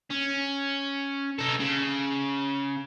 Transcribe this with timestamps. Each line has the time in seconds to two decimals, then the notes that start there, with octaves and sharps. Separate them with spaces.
0.11 C#4
1.39 D#4 A4
1.60 C#3